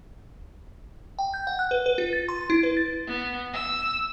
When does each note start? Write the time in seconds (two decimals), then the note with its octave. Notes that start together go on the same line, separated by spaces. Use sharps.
1.19 G5
1.34 G6
1.47 F#5
1.59 F#6
1.71 B4
1.86 B4
1.98 F4
2.13 A6
2.29 C6
2.50 E4
2.63 B4
2.77 A6
3.07 B3
3.53 E6